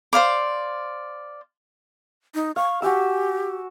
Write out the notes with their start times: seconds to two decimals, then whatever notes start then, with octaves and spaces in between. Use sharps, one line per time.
0.13 C5 D5 F5 D6
2.35 D#4
2.56 F5 C#6
2.82 F#4 G4 G#5 E6